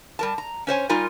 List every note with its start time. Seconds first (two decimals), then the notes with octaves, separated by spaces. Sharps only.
0.19 G3 A#4 A5
0.38 A#5
0.67 C#4 C5 C#5 G#5
0.89 G3 D#4 F4 A#4 G#5